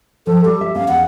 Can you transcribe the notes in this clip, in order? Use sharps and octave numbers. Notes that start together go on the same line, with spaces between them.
F3 A4
G3 G4
E5
B3 C#4 F5
E2 F#5